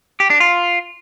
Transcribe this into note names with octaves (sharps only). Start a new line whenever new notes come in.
G4
D4
F4